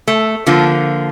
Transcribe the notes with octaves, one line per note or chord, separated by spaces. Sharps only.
A3
D3 F3 A#3 F4